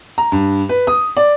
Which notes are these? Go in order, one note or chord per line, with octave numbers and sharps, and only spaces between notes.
A#5
G2
B4
D#6
D5